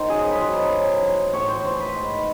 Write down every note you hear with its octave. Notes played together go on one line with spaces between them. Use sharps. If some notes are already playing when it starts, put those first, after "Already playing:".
Already playing: D#3 C5
F#2 G#4
B4
D#3 F#3 C5
A2
E3
A2 C#5
C5
E3 C5
B4
G#2